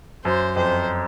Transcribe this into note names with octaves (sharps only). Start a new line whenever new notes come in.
F#2 C5
F2 C5